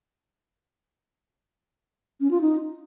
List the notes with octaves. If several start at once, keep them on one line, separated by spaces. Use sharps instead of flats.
C#4
F4
D#4